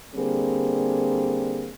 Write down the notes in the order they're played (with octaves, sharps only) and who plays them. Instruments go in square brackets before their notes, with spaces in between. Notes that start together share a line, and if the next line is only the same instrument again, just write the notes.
[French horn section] D3 G3 A#3 C4 G#4